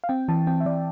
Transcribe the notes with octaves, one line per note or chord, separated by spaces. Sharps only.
F5
C4 G5
E3 A5
C4 G5
E5
E3 D5